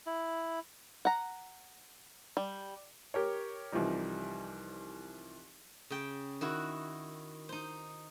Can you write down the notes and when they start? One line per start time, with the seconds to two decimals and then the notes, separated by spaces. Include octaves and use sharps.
0.06 E4
1.05 F#5 A#5
2.37 G3
3.14 G4 A#4 C#5
3.72 C2 E3 F3 G3 D#4
5.90 C#3 G5
6.41 D#3 E4 F#4
7.49 D#4 C5